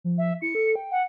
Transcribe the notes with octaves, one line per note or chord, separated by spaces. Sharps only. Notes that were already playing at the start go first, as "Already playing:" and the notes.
F3
E5
E4 C#7
A4
G5
F#5